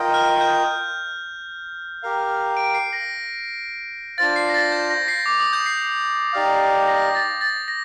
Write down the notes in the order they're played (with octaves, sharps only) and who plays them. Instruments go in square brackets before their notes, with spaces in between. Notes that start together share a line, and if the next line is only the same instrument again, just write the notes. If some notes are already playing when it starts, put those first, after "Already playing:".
Already playing: [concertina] F4 A#4 D#5 G5
[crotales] F6
G6
[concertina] G4 A#4 F5
[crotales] D7
C7
A#6
[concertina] D4 F4 C5 F5 [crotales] A6
[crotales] C7
A#6
A6
G6
A#6
C7
D6
D#6
G6
C7
[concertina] D#4 G4 D5 F5
[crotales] A#6
A6
A6
A#6